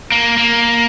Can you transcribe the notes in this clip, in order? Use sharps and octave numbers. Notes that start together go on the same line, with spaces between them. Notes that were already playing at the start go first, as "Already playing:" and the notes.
A#3
A#3